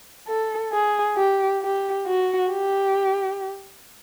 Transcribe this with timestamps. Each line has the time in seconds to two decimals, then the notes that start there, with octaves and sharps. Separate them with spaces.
0.28 A4
0.72 G#4
1.16 G4
1.62 G4
2.07 F#4
2.50 G4